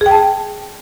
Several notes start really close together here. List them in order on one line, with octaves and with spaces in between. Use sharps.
G#4 G5 A5